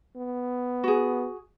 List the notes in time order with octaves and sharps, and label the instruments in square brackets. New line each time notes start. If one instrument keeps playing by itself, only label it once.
[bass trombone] B3
[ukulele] F#4 G#4